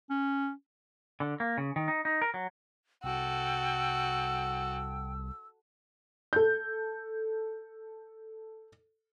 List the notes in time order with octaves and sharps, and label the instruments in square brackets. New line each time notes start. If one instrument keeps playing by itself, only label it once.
[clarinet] C#4
[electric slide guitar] D3
A#3
C#3
D#3
D#4
D#4
A#4
F#3
[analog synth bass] C2 [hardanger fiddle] F#4 A4 [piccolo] G5 [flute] E6
[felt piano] A4 G6